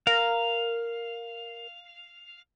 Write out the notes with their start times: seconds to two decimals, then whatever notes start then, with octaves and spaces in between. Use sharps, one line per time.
0.07 A#4 F5